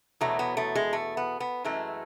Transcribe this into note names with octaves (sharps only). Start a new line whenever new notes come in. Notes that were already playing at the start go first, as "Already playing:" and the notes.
E2 B2 F#3 A3
B3
A3
G#3
A3
B3
B3
F#2 E3 G#3 A3